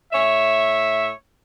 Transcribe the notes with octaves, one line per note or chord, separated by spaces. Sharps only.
A2 C#5 E5